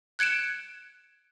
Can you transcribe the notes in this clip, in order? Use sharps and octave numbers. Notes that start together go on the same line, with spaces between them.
F#6 G#6 C#7 D7 E7